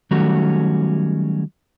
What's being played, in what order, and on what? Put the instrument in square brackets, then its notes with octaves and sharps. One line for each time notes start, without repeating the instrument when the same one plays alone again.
[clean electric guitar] D#3 F#3 G3 A3 C#4 F#4